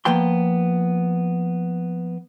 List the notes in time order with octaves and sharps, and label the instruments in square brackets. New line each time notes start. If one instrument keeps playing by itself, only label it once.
[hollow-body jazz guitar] F3 A#3 B3 G5 C6